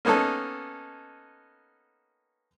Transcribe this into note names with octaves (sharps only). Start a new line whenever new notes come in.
A#3 B3 C#4 D#4 A4